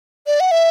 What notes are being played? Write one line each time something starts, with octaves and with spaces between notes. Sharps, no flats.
D5
F#5
E5